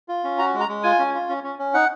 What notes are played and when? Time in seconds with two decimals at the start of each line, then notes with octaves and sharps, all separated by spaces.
0.08 F4
0.24 C#4
0.39 F#4 A#5
0.54 G#3
0.61 A#5
0.69 G#3
0.83 F4 G#5
0.99 C#4
1.14 F4
1.29 C#4
1.44 C#4
1.59 C#4
1.74 D#4 F#5